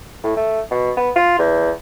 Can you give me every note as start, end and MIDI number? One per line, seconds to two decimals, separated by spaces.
0.24 0.32 45
0.37 0.60 57
0.71 0.92 47
0.97 1.10 59
1.16 1.38 65
1.39 1.70 40